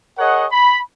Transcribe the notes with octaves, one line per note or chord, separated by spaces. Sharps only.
G#4 A#4 C#5 D#5 F#5
B5